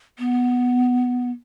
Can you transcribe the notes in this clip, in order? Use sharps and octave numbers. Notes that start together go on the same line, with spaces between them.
B3